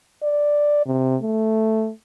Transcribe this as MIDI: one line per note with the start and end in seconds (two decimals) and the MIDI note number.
0.23 0.81 74
0.86 1.16 48
1.22 1.91 57